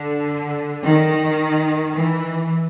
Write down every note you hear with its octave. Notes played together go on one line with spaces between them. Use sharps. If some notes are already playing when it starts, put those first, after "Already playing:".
Already playing: D3
D#3
E3